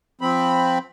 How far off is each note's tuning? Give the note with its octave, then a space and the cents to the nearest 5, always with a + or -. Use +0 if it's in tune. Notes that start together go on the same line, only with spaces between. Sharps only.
F3 +0 C4 +0 B5 +5